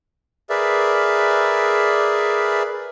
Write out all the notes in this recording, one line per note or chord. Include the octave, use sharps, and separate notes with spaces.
G#4 A#4 B4 D5 E5